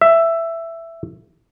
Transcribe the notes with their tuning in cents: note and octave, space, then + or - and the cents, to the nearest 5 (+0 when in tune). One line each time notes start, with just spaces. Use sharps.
E5 +10